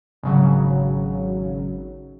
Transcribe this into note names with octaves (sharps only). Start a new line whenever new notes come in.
G#1 C#3 F#3